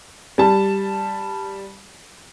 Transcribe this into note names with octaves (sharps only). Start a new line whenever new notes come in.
G3 A5